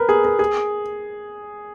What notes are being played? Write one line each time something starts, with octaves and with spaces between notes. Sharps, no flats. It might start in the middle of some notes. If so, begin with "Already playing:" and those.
Already playing: A#4 B4
G#4
A#4
G#4